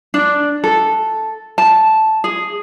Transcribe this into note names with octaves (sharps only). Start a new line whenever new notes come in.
D4
A4
A5
G#4